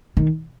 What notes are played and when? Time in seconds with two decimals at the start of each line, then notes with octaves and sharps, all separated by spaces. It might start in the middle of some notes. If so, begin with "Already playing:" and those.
0.17 D#3